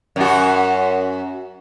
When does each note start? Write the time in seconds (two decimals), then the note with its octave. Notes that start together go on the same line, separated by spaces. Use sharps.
0.16 F#2 F#4